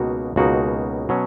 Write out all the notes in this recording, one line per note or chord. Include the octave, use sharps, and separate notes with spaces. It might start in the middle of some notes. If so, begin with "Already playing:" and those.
Already playing: C#2 B2 A#3 D#4 F#4
C#2 B2 A#3 D#4 F#4
B2 F#3 C#4